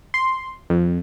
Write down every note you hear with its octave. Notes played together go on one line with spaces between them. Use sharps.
C6
F2